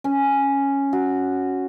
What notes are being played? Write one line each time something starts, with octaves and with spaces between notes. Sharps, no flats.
C#4
F#4